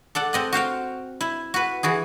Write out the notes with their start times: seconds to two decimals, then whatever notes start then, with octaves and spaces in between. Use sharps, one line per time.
0.15 A4 D5 F#5
0.33 C4 D#5 F#5
0.53 F#4 C5 F5 G5
1.21 E4
1.54 F#4 B4
1.83 E3 F#4 G#4